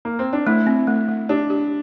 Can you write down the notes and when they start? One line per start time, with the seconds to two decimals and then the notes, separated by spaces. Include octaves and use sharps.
0.05 A#3
0.19 C4
0.33 D4
0.47 A3 E4
0.67 C4
0.87 A3
1.09 A3
1.29 D4 G4
1.50 G4